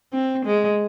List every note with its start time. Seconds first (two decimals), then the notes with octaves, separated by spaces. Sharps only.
0.12 C4
0.45 G#3